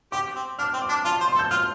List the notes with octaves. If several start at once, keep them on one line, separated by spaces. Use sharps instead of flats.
G4 D6
C4
D4 F6
C4
D6
D4
F4 A5
C6
C5
C6
A4
G6
F4 F6